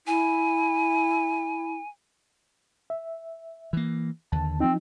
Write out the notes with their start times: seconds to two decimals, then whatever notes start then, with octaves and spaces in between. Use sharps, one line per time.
0.07 E4 G#5
2.90 E5
3.73 E3 A#3
4.32 D#2 D3 A5
4.60 F3 C4 D#4